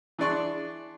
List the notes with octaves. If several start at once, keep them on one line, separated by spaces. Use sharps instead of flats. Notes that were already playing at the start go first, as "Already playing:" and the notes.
E3 D4 G#4 D5 C6 C#6